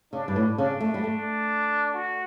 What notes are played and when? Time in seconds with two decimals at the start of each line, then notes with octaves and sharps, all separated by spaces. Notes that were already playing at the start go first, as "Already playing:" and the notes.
0.12 C#3 D4
0.28 G2
0.36 A2
0.58 C#3 D4
0.81 A3
0.94 G3
1.04 A3
1.94 F#4